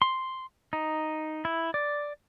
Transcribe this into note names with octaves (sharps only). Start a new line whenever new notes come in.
C6
D#4
E4
D5